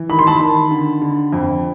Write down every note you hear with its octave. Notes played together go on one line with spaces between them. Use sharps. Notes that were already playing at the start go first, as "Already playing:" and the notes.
Already playing: E3
D#3 B5
C6
A5 B5
D#3
D3
D3
F2